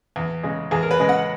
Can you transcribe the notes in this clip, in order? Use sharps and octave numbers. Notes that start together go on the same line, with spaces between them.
E2
C#3 G#3
E2 G#4
A#4
B4
C#3 G#3
F#5